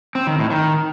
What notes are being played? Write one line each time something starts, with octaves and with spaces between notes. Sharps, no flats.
C4
D#3
A2
D#3